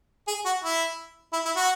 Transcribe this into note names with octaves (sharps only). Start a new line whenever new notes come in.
G#4
F#4
E4
E4
E4
F#4